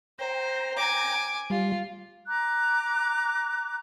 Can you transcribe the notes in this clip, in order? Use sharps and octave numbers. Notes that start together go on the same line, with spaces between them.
C5 G5 A#5
G#5 D6
G3 F4
A#5 D6 F#6